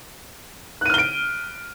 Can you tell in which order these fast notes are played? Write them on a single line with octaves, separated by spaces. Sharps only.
F#6 D#7 F6 G7 D7